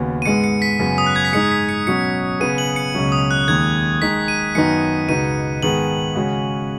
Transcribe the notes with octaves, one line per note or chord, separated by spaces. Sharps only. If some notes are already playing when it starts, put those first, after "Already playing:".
Already playing: D#2 C#3 B3 F#4
D#7
G#2 G#3 B3 C#7
C#7
B6
F#2 C#3 B3
D#6
F#6
G#6
B6
G#2 G#3 D#4 C#7
B6
C#7
B2 F#3 C#4 F#4 C#7
C#3 B3 G#4 D#7
F#7
C#7
C#2 B2 F#3 C#4
D#6
F#6
D#2 D#3 G#3 G#6
D#3 G#3 D#4 B6
D#7
F#2 D#3 B3 D#4 C#7
C#2 B2 B3 D#4 D#7
G#2 D#3 B3 G#4 F#7
C#3 G#3 C#4 F#4